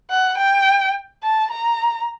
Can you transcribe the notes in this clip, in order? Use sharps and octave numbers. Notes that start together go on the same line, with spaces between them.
F#5
G5
A5
A#5